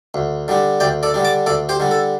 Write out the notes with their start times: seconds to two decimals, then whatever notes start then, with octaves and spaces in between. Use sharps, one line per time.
0.14 D2
0.48 D3 G3 D4
0.80 D2 D5 G5
1.03 A4 D5
1.14 D3 G3 D4
1.25 A5 D6
1.46 D2 A4 D5
1.69 G4 C5
1.80 D3 G3 D4
1.91 A4